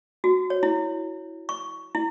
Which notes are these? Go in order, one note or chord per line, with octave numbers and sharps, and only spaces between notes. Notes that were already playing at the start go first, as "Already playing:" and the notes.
F#4
C#5
E4
C#6
E4